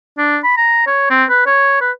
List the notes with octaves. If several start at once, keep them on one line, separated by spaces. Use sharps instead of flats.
D4
B5
A#5
C#5
C4
B4
C#5
B4